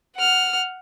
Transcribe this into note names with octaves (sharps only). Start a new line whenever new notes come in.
F#5 F6